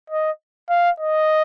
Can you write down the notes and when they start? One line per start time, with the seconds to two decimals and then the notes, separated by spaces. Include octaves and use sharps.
0.10 D#5
0.70 F5
1.00 D#5